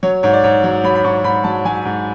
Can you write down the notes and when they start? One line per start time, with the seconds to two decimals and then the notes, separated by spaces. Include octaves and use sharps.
0.03 F#3 C#5
0.23 G#2 C#5
0.33 D5
0.43 G#2 C#5
0.64 F#3
0.84 F#3 B5
0.95 B5
1.04 G#2 C#6
1.24 G#2 B5
1.44 F#3 A5
1.65 F#3 G#5
1.85 G#2